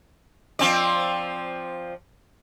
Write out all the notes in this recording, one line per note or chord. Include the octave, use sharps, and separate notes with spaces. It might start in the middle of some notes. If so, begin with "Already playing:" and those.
F3 C4 D5